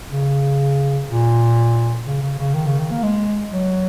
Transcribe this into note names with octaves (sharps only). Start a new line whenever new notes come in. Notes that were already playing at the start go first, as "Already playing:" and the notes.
C#3
A#2
C#3
C#3
C#3
D#3
C#3
D#3
A#3
G#3
F#3